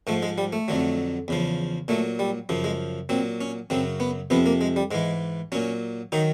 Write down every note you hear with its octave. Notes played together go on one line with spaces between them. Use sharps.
G#2 F3 A3
G#3
G3
A3
F2 D3 F#3
E2 C#3 F3
A#2 F#3 A3
G3
F#2 C#3 F3
G#3
A#2 F#3 C4
C#4
F#2 C#3 F#3 C4
B3
F2 C3 F3 B3
A#3
G#3
G3
G#2 E3 G#3
A#2 F#3 C#4
D#3 F#3 D#4